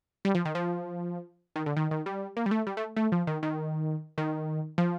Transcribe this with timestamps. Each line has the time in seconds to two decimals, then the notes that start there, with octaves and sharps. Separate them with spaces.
0.25 G3
0.35 F3
0.45 D#3
0.55 F3
1.56 D#3
1.66 D3
1.77 D#3
1.91 D#3
2.06 G3
2.37 A#3
2.46 G3
2.51 A3
2.67 G3
2.77 A3
2.96 A3
3.12 F3
3.27 D#3
3.43 D#3
4.18 D#3
4.78 F3